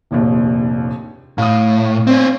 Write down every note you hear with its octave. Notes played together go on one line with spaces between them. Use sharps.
F1 A#1 D#2
A2 F5 D#6
C4 C#4